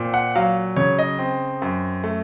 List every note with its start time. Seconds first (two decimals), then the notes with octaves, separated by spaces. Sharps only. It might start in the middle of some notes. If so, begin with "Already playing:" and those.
Already playing: A#2 C4
0.14 F#5
0.35 F#3 F5
0.76 C#3 C#5
0.99 D#5
1.19 C4
1.62 F#2
2.04 A3